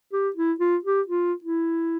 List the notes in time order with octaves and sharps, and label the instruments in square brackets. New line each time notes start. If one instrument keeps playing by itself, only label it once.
[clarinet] G4
E4
F4
G4
F4
E4